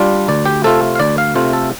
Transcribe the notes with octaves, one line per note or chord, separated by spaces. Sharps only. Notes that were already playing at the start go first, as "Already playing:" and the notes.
Already playing: G3 D4 F4
D2 D5
G4
C3 A3 C4 F4 A4
F5
D2 D5
F5
C3 A3 C4 F4
A4